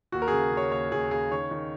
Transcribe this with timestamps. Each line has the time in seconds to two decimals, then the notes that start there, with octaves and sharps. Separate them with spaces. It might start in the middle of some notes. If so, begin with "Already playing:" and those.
0.12 D#2 F#4
0.22 A#4
0.28 C#3 G#4
0.52 C#3
0.57 C#5
0.72 D#2 C#5
0.92 D#2 G#4
1.11 C#3 G#4
1.31 D#3 C#5
1.51 D#3